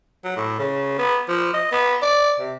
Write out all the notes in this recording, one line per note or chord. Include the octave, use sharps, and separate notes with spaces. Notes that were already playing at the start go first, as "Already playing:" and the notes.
F#3
A2
C#3
B3
F3
D#5
B3
D5
C3